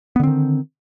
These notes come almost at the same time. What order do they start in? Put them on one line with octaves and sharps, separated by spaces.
B3 D3 C4 D#3